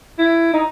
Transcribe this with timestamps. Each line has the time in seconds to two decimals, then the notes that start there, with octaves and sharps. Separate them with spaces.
0.18 E4
0.53 D#4